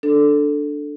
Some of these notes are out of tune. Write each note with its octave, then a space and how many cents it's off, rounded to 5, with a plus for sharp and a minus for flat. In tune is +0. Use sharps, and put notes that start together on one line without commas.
D4 +0 A4 +0